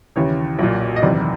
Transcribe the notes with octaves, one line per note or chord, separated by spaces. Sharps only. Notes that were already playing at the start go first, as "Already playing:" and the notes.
D#2 C#3 E3 C#5
B1 A#2
D#5
F#1 E2 C3 D#3 D5